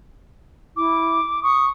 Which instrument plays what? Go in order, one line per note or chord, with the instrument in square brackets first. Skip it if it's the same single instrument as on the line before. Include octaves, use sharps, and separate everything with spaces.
[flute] E4 [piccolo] D6
[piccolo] C#6 [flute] D#6